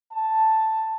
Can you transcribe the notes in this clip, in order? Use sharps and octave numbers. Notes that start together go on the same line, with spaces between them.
A5